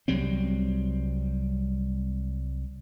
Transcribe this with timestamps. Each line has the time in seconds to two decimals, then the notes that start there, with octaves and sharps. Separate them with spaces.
0.08 C2 F#3 G3 C4